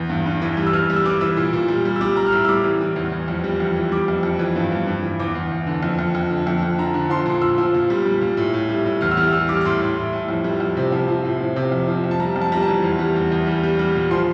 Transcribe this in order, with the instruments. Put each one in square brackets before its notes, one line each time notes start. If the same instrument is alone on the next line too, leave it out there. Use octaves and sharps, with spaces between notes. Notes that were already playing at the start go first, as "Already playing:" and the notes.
Already playing: [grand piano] E2
G2
G2
E3
G3
E6
E3 F6
G3
E6
E3 D6
E3 E6
A#2
A#2
G3
G3
E6
G3 D6
G3 A#5
F6
A2 E6
E6
G3 D6
E3
E3
E2
E2
F2
G3
F2
E3
G3 D6
F2
F2
E3
G2
G2
G2
E3
E2 D6
E2
E2
D3
F2
F2
F2
D3
F2
F2
D3 A#5
D3
F3 C6
A#2
A#2 E6
F3
A#2
G3
G3
A#2
A2
A2
G3
A2
E2 F6
E6
G3 F6
G3 E6
G3 D6
D6
A2 C6
A2
A2
A2
F2
G3
F2
C3
F3
F3
A2
F3
C3
F2
F3
F2
A5
G3 A#5
F2
A5
G3 A#5
A5
E3
E2
G3
E2
E2
G3
G3
G3
A#2
F3 C6